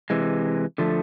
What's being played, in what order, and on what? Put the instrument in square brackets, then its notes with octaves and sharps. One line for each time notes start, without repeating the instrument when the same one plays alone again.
[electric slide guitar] C3 E3 G#3
D3 F3 A3